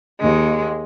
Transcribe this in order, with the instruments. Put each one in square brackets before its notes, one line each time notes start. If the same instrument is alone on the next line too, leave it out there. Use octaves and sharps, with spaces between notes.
[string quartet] D#2 G#3